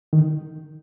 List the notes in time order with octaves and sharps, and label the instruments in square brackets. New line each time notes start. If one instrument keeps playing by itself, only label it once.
[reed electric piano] D#3